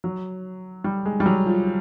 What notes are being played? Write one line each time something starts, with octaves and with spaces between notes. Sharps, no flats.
F#3
G3
G#3
G3
F#3
F3